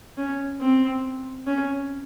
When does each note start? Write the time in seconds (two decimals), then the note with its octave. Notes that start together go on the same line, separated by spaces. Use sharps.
0.18 C#4
0.61 C4
1.47 C#4